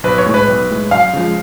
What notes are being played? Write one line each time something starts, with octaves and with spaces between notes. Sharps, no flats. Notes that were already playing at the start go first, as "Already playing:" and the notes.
B1 B4
C#5
A2 G#3
B4
B1
A2 G#3
F#2 F5
C#3 F3 G#3